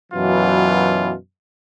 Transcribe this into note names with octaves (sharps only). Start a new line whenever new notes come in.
F#2 B2 E3 F#3 F4